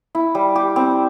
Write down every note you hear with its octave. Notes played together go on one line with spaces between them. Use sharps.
E4
G3
G4
C4